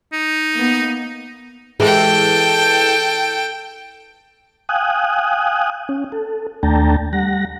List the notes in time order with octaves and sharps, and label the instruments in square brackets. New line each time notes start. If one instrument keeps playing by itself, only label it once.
[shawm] D#4
[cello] A#3 B3
[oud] E3 G#3 G4 [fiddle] A4 G5
[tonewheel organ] F5 G5 G#5 D#6 F#6
C#4
A4
D#2 A3 D4 G5 A5 A#5
G3 F#5 A#6